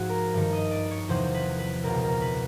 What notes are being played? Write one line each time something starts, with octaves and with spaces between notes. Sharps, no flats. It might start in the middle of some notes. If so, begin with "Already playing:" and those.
Already playing: G#2 F3 F#4 G#4
A#4
G2 D#3
D#5
D5
C#5
E2 C3 F3 C5
B4
B4
C#2 B2 A#4
A#4
B4